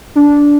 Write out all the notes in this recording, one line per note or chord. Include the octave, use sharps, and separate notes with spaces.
D4